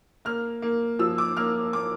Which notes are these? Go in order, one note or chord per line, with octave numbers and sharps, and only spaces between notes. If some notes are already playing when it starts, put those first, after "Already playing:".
A#3 F6
A#3
F3 E6
D6
A#3 F6
A#3 D6